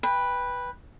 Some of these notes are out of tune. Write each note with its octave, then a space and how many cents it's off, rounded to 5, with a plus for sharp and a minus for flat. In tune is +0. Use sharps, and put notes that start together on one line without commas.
B4 -5 G5 +25